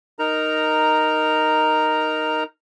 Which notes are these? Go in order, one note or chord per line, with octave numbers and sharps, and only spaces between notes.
D#4 A#4 A#5